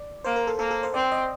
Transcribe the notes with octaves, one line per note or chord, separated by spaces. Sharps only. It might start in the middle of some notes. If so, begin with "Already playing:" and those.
Already playing: D5
A#3 C5
A#4
A4
A#3 A4
A4
C5
C4 D5
D#5